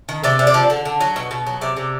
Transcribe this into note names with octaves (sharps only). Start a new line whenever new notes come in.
D#3
C3 D5
C3
D5
F3
D3
D3
F#3
B2
B2
F#3
C3 D5
C3